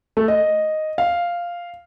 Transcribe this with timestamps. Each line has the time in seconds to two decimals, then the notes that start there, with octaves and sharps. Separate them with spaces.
0.17 A3
0.28 D#5
0.98 F5